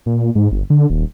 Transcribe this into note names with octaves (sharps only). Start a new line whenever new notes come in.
A#2
G#2
G1
D3
D#1